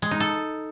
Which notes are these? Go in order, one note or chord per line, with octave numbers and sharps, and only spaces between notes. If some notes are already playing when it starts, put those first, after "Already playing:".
G#3
D#4
A4